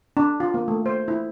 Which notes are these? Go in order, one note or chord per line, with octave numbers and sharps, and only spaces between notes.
D4
F4
A#3
A3
C5
E4